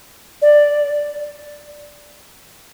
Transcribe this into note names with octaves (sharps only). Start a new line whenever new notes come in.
D5